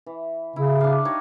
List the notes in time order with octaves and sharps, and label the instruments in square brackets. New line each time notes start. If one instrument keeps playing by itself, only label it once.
[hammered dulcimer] E3
[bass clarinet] C#3 [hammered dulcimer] E4
[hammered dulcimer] D4 F5
D#4 G4 C#5